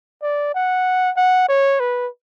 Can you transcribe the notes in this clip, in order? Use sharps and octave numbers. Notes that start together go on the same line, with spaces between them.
D5
F#5
F#5
C#5
B4